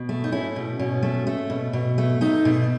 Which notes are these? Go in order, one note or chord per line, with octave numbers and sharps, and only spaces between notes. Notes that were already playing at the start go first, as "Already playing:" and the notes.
Already playing: B2
A3
D#4
A3 C#4 E4
B2
B2 C#4
A3
A3
B2
B2
A3
A3 D#4
B2